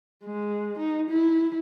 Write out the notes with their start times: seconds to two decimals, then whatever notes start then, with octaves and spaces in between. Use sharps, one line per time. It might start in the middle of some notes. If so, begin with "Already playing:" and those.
0.25 G#3
0.79 D#4
1.10 E4